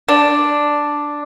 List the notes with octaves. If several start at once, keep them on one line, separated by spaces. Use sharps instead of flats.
D4